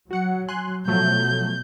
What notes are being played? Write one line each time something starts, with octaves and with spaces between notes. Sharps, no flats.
F#3 F#4 F#5 C#7
G#5 C6 F#6
B2 F3 F#3 A3 G6